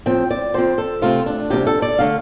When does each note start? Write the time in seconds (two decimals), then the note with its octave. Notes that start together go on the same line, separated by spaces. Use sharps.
0.06 A2 F3 C4 G5
0.31 D5
0.54 F2 F3 C4 C5
0.78 A4
1.02 C3 A3 C4 F4
1.26 D4
1.50 D2 C3 G3 D4 G4
1.67 A4
1.82 D5
1.99 D3 A3 F5